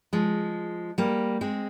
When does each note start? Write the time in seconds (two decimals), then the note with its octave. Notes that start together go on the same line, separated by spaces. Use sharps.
0.13 F3 G#3
0.98 G3 A#3
1.41 G#3 C4